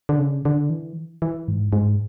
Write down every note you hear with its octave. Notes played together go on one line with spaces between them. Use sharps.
D3
C#3
D3
E3
E3
G#2
G#2